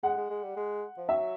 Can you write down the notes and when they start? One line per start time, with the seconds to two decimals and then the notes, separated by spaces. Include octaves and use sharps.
0.03 G#3 F#5
0.17 G#3
0.30 G#3
0.43 G3
0.56 G#3
0.97 F3
1.09 F#3 E5